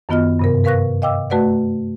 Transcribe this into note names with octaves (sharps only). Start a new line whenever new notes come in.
F#2 D#3 B3 F4 D#5 F6
G2 C3 A#4
A#4 B4 F5 C#6 F#6 A#6
D#5 F5 G5 D6 E6
A3 F#4 B4 D5 F#5